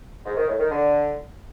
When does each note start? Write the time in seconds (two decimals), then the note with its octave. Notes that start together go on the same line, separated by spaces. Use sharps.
0.24 G#2
0.36 D#3
0.47 A2
0.59 D#3
0.70 D3